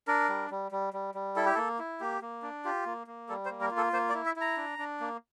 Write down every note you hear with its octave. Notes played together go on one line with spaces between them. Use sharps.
D4 A#4
G3
G3
G3
G3
G3
E4 A4
G4
A#3 A4
E4
A#3 G4
A#3
D4
F4 G4
A#3
A#3
G3 A4
C5
A#3
A#4
F4
A4
A#3 C5
D5
E4
E5
E4 A#5
D4
D4
A#3